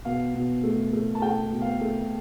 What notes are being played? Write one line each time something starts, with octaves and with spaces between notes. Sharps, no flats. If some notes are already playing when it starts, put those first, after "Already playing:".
B2 F5
B2
A3
A3
A5
A3 G5
B2
F5
A3